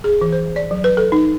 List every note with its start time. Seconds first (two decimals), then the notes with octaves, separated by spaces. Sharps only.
0.04 G#4
0.21 E3
0.33 C5
0.56 D5
0.71 F#3
0.84 B4
0.97 A4
1.12 D#4